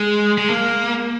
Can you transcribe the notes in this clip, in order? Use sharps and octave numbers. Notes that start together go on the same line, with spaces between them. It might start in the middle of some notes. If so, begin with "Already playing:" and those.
Already playing: G#3
G#3
A#3